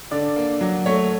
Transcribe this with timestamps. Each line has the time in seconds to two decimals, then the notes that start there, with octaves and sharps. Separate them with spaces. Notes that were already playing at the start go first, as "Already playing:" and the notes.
0.11 D3 D5
0.36 A#3
0.61 F#3
0.86 A3 C#5